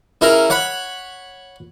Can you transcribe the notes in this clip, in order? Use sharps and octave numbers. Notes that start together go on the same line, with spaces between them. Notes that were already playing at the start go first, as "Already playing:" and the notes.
C#3 E4 A#4
C#5 F#5 B5